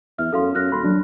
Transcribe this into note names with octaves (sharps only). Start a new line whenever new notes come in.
E2 E5 F6
F#2 A4 F5 C6
F#2 F6 F#6 A#6
D#1 B5 C6
F#3 D4